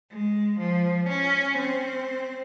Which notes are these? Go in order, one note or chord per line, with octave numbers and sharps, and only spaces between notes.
G#3
F3
C#4
C4